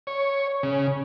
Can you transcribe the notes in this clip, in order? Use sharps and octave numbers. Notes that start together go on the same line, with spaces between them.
C#5
C#3